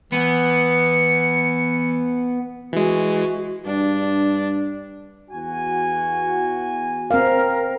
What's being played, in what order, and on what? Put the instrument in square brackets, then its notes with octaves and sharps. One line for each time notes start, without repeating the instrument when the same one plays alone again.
[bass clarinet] E3 [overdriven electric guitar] B3 [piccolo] C#7
[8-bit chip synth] E3 G#3 [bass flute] F#4
[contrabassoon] G2 [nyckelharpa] D4
[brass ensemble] E2 F#4 G#5
[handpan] C4 F5 [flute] A#4